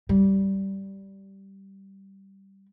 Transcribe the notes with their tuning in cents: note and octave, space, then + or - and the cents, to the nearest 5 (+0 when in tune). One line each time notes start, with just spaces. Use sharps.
G3 -10